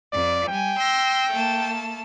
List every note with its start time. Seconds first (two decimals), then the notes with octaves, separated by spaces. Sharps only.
0.13 F2 D5
0.48 G3 G5 G#5
0.78 C6 E6 A#6
1.30 A3 A#3 A5